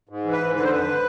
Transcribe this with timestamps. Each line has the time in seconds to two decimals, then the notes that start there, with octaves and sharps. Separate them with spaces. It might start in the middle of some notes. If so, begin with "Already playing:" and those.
0.09 G#2
0.24 E3
0.32 B4
0.40 G#2
0.55 D3 B4
0.63 C5
0.70 F2 B4